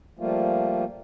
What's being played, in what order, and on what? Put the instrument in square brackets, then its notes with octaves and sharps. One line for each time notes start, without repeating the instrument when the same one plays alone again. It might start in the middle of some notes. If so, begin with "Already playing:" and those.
[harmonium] F3 G3 A3 A#3 F4